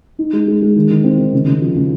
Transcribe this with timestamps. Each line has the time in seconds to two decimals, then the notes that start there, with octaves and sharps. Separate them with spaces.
0.19 D#4
0.33 G#3
0.48 G#3
0.62 G#3
0.76 D#3
0.90 D#3
1.04 C4
1.18 D#3
1.33 C#3
1.47 C#3
1.62 F3
1.76 C#3